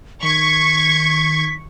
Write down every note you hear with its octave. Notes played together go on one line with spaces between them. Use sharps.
D#3 C#6 G#6 B6